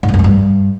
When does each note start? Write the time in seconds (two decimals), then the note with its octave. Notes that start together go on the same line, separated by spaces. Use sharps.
0.03 G#2
0.08 G2
0.14 F#2
0.19 G#3
0.24 G2